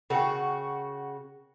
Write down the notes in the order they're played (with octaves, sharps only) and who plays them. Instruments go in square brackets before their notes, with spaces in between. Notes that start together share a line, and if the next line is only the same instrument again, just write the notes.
[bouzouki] C#3 F#4 [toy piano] A#4 G5